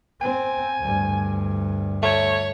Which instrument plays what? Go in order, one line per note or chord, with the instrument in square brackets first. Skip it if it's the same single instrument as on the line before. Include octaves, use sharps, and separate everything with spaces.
[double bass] C4 [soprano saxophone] G#5
[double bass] D2 G2
[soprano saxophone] A3 [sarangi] C#5